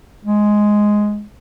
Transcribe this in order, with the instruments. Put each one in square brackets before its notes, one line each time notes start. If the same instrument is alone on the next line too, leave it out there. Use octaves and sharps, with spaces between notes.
[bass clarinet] G#3